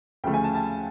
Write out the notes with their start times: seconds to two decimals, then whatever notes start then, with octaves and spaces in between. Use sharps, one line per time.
0.24 D2 C#3 F3 A3 G5
0.34 G#5
0.44 A5
0.55 A5